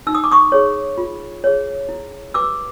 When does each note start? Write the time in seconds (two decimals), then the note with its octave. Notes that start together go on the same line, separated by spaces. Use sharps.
0.07 D#4 E6
0.15 D#6
0.24 D6
0.32 C#6 D#6
0.52 G#4 C#5
0.98 F4
1.44 G#4 C#5
1.89 E4
2.34 G4 B4 D6 E6